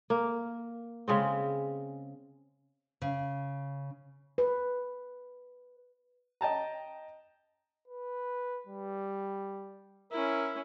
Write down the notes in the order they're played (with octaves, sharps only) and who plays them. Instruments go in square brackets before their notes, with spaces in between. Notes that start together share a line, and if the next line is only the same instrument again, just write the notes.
[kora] A#3
C#3 G#3 C4
[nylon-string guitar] C#3
[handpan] B4
[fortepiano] D#5 G5 A5 A#5
[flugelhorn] B4
G3
[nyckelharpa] C#4 E4 [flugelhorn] A#4